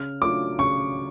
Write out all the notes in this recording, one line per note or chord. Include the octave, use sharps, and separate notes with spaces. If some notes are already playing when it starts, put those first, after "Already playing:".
Already playing: C#3 F6
F#3 A3 D4 F4 D6
C#3 C#6